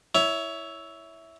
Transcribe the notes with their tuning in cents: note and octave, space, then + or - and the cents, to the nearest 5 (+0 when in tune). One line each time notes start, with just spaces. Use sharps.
E4 -5 C#5 +20